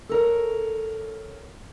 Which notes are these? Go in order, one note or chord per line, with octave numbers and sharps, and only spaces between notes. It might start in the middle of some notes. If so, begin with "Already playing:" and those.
A4 A#4 C#5